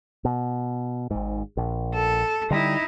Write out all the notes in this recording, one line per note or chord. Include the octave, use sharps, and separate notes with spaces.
B2
G#1 G#2
A#1
A4
D3 G3 D#4 E4